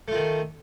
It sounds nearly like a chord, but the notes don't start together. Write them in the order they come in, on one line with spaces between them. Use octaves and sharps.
A3 F4 D#3